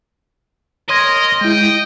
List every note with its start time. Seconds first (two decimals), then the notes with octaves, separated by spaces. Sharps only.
0.89 A#4 C#5 D#5 C6 G#6
1.41 G#3 E4 G5